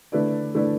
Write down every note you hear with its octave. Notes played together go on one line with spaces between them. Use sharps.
D3 A3 E4 B4 D5
D3 A3 E4 B4 D5